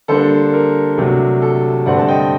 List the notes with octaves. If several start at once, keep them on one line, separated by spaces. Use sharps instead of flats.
D3 G3 A#3 D4 A4 C5
A#4
C3 F#3 A3 D4
A4
G2 D3 A3 C4 D5 F#5
A5
D#5 G5